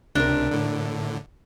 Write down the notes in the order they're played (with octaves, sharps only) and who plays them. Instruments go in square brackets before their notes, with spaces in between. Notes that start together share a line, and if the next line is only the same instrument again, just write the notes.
[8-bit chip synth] C#2 C3 [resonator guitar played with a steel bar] D4 A#4
[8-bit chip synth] A2 D3